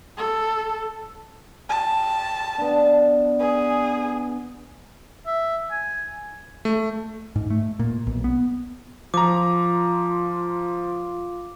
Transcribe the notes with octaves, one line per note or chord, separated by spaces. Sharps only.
A4
G4 A5
B3 D4
G#4 B4
E5
G#5
A3
G#2
A3
A#2
B1
B3
F3 F4 A#5 D6